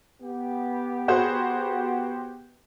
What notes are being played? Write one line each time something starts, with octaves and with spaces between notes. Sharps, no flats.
B3 G4
F#4 G#4 C5